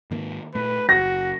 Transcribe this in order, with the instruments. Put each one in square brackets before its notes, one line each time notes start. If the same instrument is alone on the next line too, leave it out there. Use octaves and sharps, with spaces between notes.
[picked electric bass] G#2 D#3 A#3
[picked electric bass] A#2 A3 [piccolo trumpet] B4
[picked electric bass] F#1 [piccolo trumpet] F#4 [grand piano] A#6